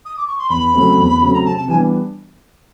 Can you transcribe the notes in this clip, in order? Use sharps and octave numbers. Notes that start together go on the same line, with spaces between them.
D#6
D6
C#6
C6
E2 B5
C#3 F#3 A3 C4
E2
C#3 F#3 A3 C4
A#5
C3 A5
A5
E3 G3 B3 D4 G#5